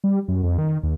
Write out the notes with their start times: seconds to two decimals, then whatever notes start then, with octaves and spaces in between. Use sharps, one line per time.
0.04 G3
0.28 F#2
0.43 F2
0.58 D#3
0.83 D#2